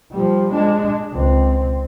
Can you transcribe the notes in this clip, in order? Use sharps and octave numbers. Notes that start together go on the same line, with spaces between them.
F3 G3
G#3 D4
C#2 C4